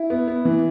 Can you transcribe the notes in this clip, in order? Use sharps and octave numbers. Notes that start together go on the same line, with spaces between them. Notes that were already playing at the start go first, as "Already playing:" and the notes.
Already playing: E4
B3
B3
E3